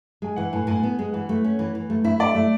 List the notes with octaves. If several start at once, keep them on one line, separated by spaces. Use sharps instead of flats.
G#3 G#5
E3 F#5
A2 G#5
A2 G#5
B3
G#3
E3 F#5
A3
C#4
E3
E3
A3
E4 E5
A3 D5
A3 E5